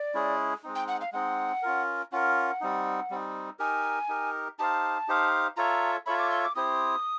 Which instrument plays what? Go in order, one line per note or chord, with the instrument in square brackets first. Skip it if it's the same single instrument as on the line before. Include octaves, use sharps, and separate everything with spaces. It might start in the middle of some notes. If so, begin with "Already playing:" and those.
Already playing: [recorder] D5
[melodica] G#3 C#4 E4 G#4
G#3 C4 D#4
[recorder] G5
F#5
F5
[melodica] G#3 C4 D#4 [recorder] F#5
[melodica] C#4 F4 A#4
[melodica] C#4 F4 A#4 [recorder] F#5
[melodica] G3 C4 D#4
G3 C4 D#4
[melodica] D#4 G4 A#4 [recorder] G#5
[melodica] D#4 G4 A#4
[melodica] D#4 G4 C5 F5 [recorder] A5
[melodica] D#4 G4 C5 F5
[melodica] F4 A4 C#5 E5 [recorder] A#5
[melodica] F4 A4 C#5 E5 [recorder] B5
[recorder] D6
C6
D6
[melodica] C4 E4 G4 C5 [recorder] D#6